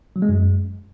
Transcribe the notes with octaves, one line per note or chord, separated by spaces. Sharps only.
F#3
G#3
F#2